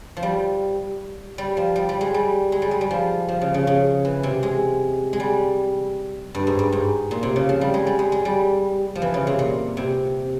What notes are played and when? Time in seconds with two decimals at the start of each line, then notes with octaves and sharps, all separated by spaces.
0.17 F3
0.23 G3
1.38 G3
1.57 F3
1.76 G3
1.89 G3
2.01 G#3
2.14 G3
2.52 G#3
2.62 G3
2.71 G#3
2.81 G3
2.91 F3
3.29 F3
3.41 C#3
3.54 C#3
3.67 C#3
4.05 E3
4.23 C3
4.43 G#3
5.13 G#3
5.20 G3
6.35 G2
6.47 G#2
6.59 G2
6.72 G#2
7.11 A#2
7.23 C3
7.36 C#3
7.49 F3
7.61 G3
7.74 G#3
7.87 G3
7.99 G#3
8.12 G#3
8.25 G3
8.95 F3
9.02 E3
9.14 C#3
9.27 C3
9.39 A#2
9.77 C3